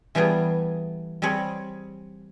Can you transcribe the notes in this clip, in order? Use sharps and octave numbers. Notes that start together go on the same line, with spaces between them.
E3 G3 A3 B3 G#4
G3 C4 G#4 C#5